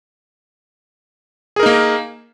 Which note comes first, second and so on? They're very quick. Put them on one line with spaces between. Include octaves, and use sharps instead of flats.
G#4 A#4 D#4 A#3